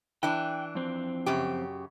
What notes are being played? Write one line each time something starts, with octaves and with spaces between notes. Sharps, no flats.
E3 D4 G5
F2 C4
F#2 C#3 G4